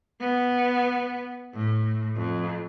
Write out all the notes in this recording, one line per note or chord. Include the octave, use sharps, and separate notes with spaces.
B3
A2
F2